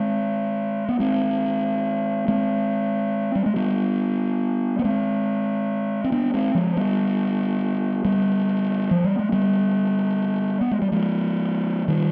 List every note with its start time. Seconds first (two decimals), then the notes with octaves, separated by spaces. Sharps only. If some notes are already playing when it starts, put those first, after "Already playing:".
Already playing: G#3 C4
0.89 B3
1.00 G#3 C4
2.28 G#3 C4
3.35 G3
3.46 G#3
3.56 G3 B3
4.79 B3
4.84 G#3 C4
6.04 C4
6.12 B3 D4
6.34 G#3 C4
6.55 F3 G#3
6.77 G3 B3
8.05 G3 B3
8.91 F3
9.04 G3
9.19 G#3
9.32 G3 B3
10.61 B3
10.71 G#3
10.82 G3
10.92 F3 G#3
11.88 D#3 G3